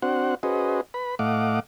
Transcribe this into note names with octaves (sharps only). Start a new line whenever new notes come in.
C4 D4 F#4 C5 F#5
C#4 F#4 G#4 B4 C5 D#5
B4 B5
A2 A3 D#5 F5 F#5 D6